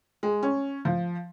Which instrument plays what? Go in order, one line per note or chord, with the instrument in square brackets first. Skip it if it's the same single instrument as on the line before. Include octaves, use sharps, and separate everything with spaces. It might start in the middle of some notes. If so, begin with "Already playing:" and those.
[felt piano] G#3
C#4
F3